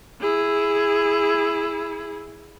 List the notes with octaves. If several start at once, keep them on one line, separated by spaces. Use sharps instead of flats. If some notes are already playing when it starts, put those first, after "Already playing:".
E4 G#4